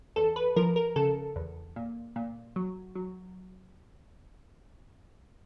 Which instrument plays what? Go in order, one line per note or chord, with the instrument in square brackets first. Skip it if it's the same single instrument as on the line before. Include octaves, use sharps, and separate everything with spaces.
[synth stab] E2 A4
B4
F3 A#4
A#4
C#3 A4
E2
A#2
A#2
F#3
F#3